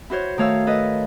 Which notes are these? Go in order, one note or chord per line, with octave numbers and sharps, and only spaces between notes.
E4 F#4 C5 C#5
D#3 A3 C#5 F5 E6
A4 B4 D#5